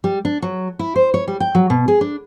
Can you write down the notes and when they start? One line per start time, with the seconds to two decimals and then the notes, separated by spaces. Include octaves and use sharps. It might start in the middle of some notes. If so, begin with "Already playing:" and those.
0.04 G3
0.25 D4
0.42 F#3
0.79 E4
0.96 C5
1.14 C#5
1.28 G3
1.40 G5
1.55 F#3
1.70 B2
1.88 G#4
2.01 D4